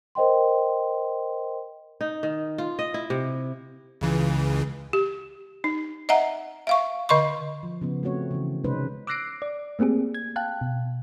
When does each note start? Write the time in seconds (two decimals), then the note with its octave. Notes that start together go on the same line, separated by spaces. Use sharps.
0.15 A#4 C5 D#5 G5 C6
2.01 D#4
2.23 D#3
2.58 F4
2.79 D#5
2.94 E4
3.10 C3
4.01 C#2 C#3 E3
4.93 G4
5.64 D#4
6.09 D#5 E5 F#5 A#5
6.67 E5 F5 C#6
7.09 D3 D#5 C6 C#6
7.63 F3
7.81 C#3 F3 B3
8.03 A3 C4 F#4 C#5
8.31 C#3 E3
8.64 C3 G#3 C#4 D#4 B4 C5
9.07 D6 E6 F#6 A#6 C7 D7
9.42 D5
9.79 A3 A#3 C4 G4 G#4
10.14 G#6
10.36 F5 G5 A5 F#6
10.61 B2